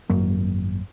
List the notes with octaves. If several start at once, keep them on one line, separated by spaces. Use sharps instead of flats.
G#1 F#2 F#3 A#3